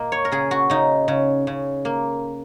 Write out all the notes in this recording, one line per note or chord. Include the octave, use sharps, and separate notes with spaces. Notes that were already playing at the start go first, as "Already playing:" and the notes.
Already playing: A#2 A#3 D#5
C#5
A#4
C#3 G#4
F#4
C#3 D#4
C#3
C#3
A#3